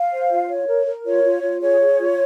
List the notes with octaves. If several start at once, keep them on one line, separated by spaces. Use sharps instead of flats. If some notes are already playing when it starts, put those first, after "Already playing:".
Already playing: F5
C5
F4
C#5
A#4
A#4
F4 C#5
F4
F4
G#4 C#5
G#4
F4